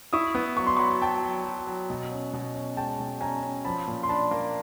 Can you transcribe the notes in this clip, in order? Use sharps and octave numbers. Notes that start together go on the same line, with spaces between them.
E4 C#6 D#6
B3
F#3 C#6
C6
F#3 B5 C#6
F#3 G5 A5
F#3
F#3
F#3
B2
C#4
B2
C#4
G#3 G5 A5
B2
C#4 G#5 A#5
C#4
F3 A5 B5
A#2
C6
D4 A5 B5
A#3